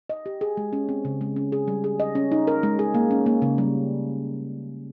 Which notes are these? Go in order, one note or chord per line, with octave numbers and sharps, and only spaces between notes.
D#5
G4
G#4
G#3
C#4
C4
C#3
G#3
C#4
G#4
G3
G#4
D#5
C#4
D#4
A#4
G#3
G#4
A#3
C#4
A#3
C#3
G3